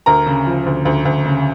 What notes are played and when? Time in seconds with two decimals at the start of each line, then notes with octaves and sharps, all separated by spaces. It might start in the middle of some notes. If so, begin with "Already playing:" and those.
0.06 D2 A#4 A#5
0.26 C#3
0.47 F3
0.66 D2
0.85 D2
1.05 D2
1.26 C#3